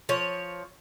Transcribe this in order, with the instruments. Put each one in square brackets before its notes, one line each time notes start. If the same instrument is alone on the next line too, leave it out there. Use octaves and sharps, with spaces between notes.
[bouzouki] F3 C#5